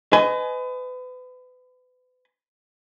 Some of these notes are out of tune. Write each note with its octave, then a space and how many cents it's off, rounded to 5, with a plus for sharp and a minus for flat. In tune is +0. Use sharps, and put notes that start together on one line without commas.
B4 +35 D#5 +0 G#5 +25